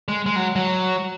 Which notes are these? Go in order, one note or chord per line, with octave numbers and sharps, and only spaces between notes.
G#3
G#3
F#3
F#3